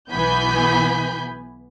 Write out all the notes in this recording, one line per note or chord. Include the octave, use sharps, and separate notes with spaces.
B1 E3 B3 G#5 B5 G6